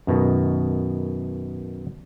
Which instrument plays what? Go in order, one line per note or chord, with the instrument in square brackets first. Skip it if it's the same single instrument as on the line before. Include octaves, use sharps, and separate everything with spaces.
[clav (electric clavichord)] F#2 B2 D#3